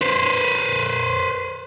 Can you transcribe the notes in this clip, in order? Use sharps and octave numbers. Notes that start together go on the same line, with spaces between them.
B4 C5